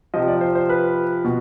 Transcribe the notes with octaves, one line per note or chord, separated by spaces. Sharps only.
C3 F3 D#5
D5
C5
C5
B4
B2